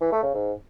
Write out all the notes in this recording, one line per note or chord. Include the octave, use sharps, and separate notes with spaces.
E3
A3
C#3
G#2